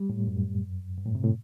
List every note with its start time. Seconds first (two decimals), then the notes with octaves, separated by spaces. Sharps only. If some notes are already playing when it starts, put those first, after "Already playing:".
Already playing: G3
0.10 A2
0.27 F#2
0.98 G2
1.06 A2
1.15 C3
1.24 A2